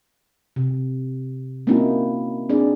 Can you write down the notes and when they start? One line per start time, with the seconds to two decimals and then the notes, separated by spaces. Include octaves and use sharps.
0.56 C3
1.67 A#3 C4 C#4 D#4 E4 F#4
2.49 C4 D4 D#4 G#4 D5